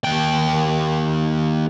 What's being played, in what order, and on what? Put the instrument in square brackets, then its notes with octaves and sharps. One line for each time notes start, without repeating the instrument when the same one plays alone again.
[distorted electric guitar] D#2 G5